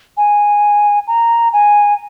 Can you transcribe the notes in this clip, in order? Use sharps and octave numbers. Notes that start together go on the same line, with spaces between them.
G#5
A#5
G#5